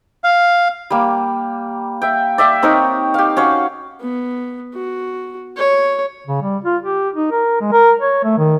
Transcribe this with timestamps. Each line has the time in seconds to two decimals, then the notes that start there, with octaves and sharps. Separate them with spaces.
0.24 F5
0.90 G3 A#3
2.02 E5 G5
2.38 D5 E5 G5
2.62 C4 D#4 A#4 C#5
3.14 G4 F5
3.37 C#4 F#4 C#5 F5
4.01 B3
4.75 F#4
5.57 C#5
6.27 C#3
6.42 G3
6.65 F4
6.83 G4
7.14 D#4
7.32 A#4
7.61 G#3
7.72 A#4
8.01 C#5
8.24 A3
8.38 D#3